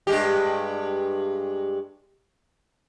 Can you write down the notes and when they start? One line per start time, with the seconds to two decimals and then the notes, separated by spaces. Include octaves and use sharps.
0.07 G2 G#3 G4